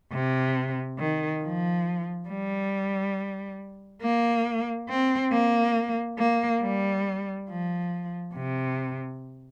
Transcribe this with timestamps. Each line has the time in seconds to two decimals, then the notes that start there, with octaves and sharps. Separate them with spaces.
0.12 C3
0.98 D#3
1.43 F3
2.29 G3
4.02 A#3
4.89 C4
5.32 A#3
6.18 A#3
6.62 G3
7.49 F3
8.35 C3